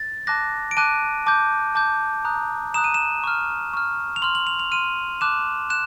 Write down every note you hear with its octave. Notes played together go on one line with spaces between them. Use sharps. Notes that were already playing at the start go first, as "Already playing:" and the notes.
Already playing: A6
A5 D6 F#6 A#6
D7
A5 D6 F#6 D#7
A5 D6 G6
A5 D6 G6
A#5 D#6 F#6
A#5 D#6 F#6 E7
D#7
E7
C#6 F6
C#6 F6
F7
C6 F6 F#7
F#7
F7
F7
C6 F6 D#7
A5 D6 F#6 E7
F#6 E7